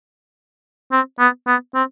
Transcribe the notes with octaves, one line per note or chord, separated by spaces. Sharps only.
C4
B3
B3
C4